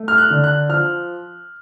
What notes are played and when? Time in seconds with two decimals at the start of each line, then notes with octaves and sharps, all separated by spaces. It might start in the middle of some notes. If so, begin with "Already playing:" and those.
Already playing: A3
0.08 F6
0.18 F#6
0.31 D3
0.44 F#6
0.69 F3 F6